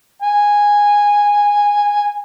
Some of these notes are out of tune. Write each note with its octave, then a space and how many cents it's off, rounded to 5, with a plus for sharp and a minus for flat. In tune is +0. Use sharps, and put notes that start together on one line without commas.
G#5 -10